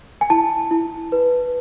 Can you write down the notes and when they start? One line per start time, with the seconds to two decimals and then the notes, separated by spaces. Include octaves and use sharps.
0.21 G#5
0.30 E4 A5
0.71 E4
1.12 B4